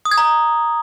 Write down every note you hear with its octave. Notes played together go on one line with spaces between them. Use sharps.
D#6
G#6
A#5